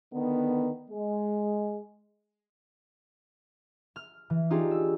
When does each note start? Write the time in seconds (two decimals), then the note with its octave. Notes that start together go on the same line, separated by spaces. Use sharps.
0.14 D3 D#3 B3
0.90 G#3
3.96 F6
4.30 E3
4.50 D4 D#4 F4 G4 G#4
4.71 E6